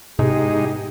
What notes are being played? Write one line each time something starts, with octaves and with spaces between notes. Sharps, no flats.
G#2 C3 G#3 B3 D#4 E4 G4